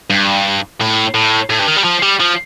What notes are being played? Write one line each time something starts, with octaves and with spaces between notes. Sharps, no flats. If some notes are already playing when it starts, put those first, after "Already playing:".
G2
A2
A2
A2
G2
D#3
G3
F3
G3
F3